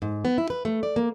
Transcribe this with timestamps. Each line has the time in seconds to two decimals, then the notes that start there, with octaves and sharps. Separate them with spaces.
0.02 G#2
0.25 B3
0.38 E4
0.50 B4
0.65 A3
0.83 D5
0.96 A#3